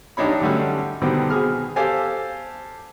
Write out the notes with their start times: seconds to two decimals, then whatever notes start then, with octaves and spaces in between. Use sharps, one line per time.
0.17 A1 G2 D4 D#4 C#5 B5
0.41 D3 F#3 G3 A3 C#4
1.02 B2 D3 D#3 G3 B3 C4
1.30 B2 G#4 F6
1.76 G4 A4 C5 F5 G#5 A5